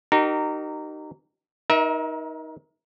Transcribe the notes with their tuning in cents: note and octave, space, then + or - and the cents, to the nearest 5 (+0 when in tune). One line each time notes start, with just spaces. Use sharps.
D#4 -20 G4 -45 A#4 -15
D#4 +15 A#4 +30 E5 -25